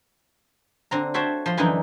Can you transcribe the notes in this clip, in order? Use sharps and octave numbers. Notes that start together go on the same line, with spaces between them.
D3 C4 A#5
F#4 A4 C5 C#5 E5 G5
F3 C6
F#2 D3 E3 D#4 E4 G5